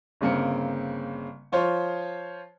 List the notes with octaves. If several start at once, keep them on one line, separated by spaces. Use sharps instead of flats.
G1 C#3 A#3 C4 C#7
F3 F4 C5 C#5